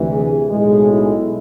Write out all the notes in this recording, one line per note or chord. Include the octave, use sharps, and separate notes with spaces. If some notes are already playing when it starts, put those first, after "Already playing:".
Already playing: D2 C3 E3
G#4
B1 A2 G#3 G#4
E4